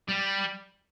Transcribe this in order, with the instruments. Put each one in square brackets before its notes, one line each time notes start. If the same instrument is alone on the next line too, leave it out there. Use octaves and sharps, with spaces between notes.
[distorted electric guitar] G3